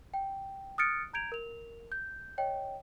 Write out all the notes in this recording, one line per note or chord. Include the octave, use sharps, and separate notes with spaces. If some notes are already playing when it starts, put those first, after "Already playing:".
G5
D#6 F6 F#6 A6 C#7 D7
A#5 G6 G#6 D7 F7
A#4 F7
G6
C#5 D#5 G5